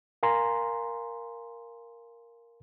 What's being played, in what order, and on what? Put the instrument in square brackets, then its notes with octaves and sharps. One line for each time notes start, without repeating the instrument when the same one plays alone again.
[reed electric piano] A#4 F5 G#5 A#5 C6